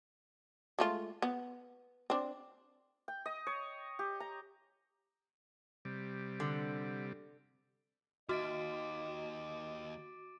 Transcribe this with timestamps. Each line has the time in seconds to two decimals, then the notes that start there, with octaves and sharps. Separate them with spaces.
0.79 G#3 A3 F4
1.22 B3
2.10 C4 D4
3.08 G5
3.26 D#5
3.47 C#5
3.99 G4
4.20 A#5
5.85 C3 G3
6.40 D3
8.29 D#2 F#4 D#5 D6 A6 D7